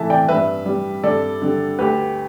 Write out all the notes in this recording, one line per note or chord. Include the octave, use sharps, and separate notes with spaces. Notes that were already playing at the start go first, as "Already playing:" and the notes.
Already playing: A2 E3 A3 E5 A5
D5 G5
G2 B4 E5
G3
G2 A4 D5
D3 G3
D2 G4 B4